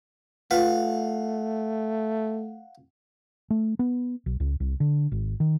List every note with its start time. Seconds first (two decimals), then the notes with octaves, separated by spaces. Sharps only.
0.51 A3 F4 B4 F5 F#5
3.50 A3
3.79 B3
4.26 B1
4.40 C#2
4.60 C2
4.80 D3
5.12 G#1
5.40 D#3